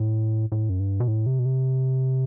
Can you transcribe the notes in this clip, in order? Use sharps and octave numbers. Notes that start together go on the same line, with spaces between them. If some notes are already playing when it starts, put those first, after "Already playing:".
Already playing: A2
A2
F#2
G2
B2
A2
C3
B2
C3